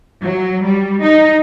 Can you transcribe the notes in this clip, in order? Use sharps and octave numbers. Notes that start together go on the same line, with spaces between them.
F#3
G3
D#4